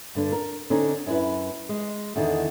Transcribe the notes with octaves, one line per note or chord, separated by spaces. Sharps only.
G2 D3 D4
A#4
D3 C4 C#4 D#4
F#2 C#4 D4 E4 B4
G#3
E2 D3 D#3 D#4